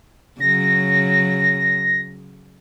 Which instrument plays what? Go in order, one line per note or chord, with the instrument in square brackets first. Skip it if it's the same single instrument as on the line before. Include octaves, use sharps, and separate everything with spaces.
[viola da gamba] C#3 F#3 [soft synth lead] A#6